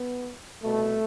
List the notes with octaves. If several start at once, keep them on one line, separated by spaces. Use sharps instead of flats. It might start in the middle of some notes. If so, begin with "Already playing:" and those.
Already playing: B3
C2 B2 A3